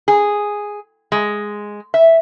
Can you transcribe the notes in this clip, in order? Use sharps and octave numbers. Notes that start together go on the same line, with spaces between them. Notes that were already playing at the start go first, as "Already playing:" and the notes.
G#4
G#3
E5